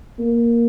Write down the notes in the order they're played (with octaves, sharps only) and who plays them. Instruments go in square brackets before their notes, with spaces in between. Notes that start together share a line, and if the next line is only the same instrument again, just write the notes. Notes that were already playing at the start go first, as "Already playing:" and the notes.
[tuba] A#3